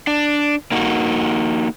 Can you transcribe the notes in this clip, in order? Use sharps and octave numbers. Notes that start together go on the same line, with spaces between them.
D4
A#3 D#4 F#4